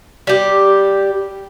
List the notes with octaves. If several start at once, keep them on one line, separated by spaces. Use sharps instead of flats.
G3 G4